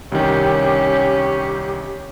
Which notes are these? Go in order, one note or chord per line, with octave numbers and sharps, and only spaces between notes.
C2 D#3 C#4 G4